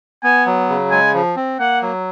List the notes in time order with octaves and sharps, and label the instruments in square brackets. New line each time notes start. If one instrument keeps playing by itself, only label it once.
[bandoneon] B3 [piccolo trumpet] G#5
[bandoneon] F#3
C#3
[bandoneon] G#3 [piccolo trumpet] G#5
[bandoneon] F3
C4
[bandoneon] A#3 [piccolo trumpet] F#5
[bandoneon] F#3